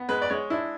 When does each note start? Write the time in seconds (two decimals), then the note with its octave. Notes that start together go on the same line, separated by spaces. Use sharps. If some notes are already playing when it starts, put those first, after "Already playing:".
Already playing: B3
0.09 G#3 B4
0.22 D5
0.30 G#3 C#5
0.50 D4 E4